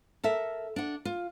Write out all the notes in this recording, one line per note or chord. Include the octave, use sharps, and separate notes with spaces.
A4 A#4 E5
D4 F#5
F4